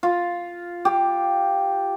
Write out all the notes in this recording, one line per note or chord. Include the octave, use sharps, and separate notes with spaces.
F4
G4